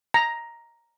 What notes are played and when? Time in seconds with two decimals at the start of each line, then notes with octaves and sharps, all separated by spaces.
0.14 A#5